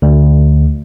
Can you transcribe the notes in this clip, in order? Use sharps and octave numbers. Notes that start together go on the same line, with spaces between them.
D2